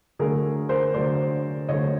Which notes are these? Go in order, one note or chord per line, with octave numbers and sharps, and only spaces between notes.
D3 F#3 A3 G#4 A#4
A#4 C5
D3 F#3 A3 C5 D5
D3 F#3 A3 C#5 D#5